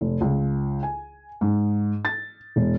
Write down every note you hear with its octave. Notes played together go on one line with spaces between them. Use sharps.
F1
C#2
G#5
G#2
A6
E1